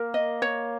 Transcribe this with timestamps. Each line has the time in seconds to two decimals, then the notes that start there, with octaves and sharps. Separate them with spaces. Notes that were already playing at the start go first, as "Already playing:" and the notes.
Already playing: A#3 A#4
0.14 D#5
0.42 C#5